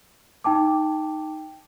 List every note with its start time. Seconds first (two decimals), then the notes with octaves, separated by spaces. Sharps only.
0.44 D#4 G5 A5 D6